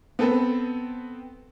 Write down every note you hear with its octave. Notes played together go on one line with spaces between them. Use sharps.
B3 C4 A4 B4